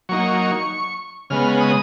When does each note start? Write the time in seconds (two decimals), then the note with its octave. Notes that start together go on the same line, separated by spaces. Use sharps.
0.09 F#3 A#3 D#4 C#6
1.30 C#3 G#3 B3 F6
1.61 D#6